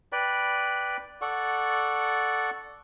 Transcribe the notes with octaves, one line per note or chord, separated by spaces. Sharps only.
B4 D5 G5 B5
A4 D5 F#5 C#6